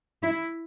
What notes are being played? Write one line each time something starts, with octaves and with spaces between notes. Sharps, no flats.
E4